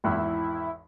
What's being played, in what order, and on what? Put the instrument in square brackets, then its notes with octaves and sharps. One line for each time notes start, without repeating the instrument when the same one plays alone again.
[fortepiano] G#1 E2 [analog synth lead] E4